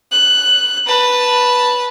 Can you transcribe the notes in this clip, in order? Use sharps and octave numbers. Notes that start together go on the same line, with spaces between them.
F#6
B4 A5